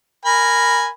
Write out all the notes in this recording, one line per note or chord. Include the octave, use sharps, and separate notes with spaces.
A#4 G#5 B5